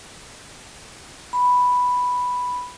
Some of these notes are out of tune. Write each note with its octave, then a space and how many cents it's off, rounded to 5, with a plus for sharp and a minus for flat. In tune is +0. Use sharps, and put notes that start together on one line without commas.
B5 +0